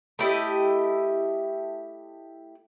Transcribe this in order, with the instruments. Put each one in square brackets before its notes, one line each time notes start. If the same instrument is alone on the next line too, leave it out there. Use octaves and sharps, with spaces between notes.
[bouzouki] A3 E4 G4 D#5